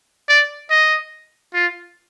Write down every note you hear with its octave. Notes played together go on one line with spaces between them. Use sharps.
D5
D#5
F4